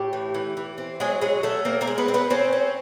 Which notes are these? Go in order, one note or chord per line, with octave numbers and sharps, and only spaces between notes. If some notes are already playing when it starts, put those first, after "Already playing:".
Already playing: A2 G4
E3
E3
E3
C4
F#3 G#3 G#4
F#3 G#3 G#4
F#3 A3 A4
A#3 C4 A#4
A#3 A#4
G#3
B3 B4
C4
B3 B4
C4 C#4 C5
C#4